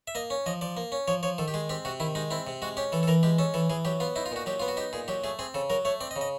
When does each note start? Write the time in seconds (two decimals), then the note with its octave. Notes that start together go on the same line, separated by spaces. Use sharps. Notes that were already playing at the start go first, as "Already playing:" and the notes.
0.07 E5
0.15 A#3 D#5
0.30 C#4
0.46 F3 D#5
0.61 F3 D5
0.77 A#3
0.92 C#4
1.08 F3 C#5
1.23 F3 C#5
1.38 D#3 A4
1.48 G4
1.54 G#3 G#4
1.69 C4 G4
1.85 C3 F#4
2.00 D#3 E4
2.15 G#3 D#4
2.31 C4 E4
2.47 C3
2.62 G#3 F#4
2.77 C#4 G4
2.92 E3 A4
3.03 A4
3.08 E3 A#4
3.23 G#3 G4
3.38 C#4 A4
3.54 E3 A4
3.70 E3 G#4
3.85 F#3 G4
4.00 B3 F4
4.16 D#4 E4
4.26 F4
4.31 A#2 F#4
4.46 F#3 G4
4.60 B3 F4
4.68 F#4
4.77 D#4 G4
4.93 A#2 G#4
5.08 F#3 G4
5.24 A3 G#4
5.39 C4 G#4
5.54 C#3 A4
5.70 F#3 A#4
5.85 A3 C#5
6.01 C4 D5
6.11 D#5
6.16 C#3
6.21 D#5